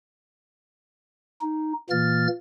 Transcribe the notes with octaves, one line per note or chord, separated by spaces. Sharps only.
D#4
A#2 E3 A#3 F6 A6